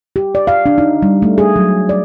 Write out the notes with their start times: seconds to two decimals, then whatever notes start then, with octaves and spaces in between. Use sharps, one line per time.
0.16 G4
0.35 D5
0.47 F5
0.66 D4
0.78 D#4
1.02 G3
1.22 A3
1.38 G#4
1.56 F#3
1.89 D5